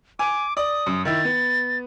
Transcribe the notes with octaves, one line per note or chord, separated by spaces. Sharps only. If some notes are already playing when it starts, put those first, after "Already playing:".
G#5 D6
D5 D#6
F#2
D#3 E4 A6
B3